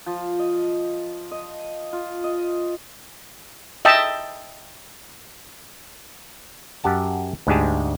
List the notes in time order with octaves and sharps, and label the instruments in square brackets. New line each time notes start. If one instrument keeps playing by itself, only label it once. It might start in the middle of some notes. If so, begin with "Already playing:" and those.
[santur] F3
D#5
D#5
F4
D#5
[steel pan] D#5 E5 G5 A5
[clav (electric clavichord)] F#2 G4 F#5 A5
D2 G#2 G#3 G4 G#4 A5